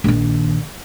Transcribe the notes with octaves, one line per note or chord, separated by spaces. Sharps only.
A#1 D#3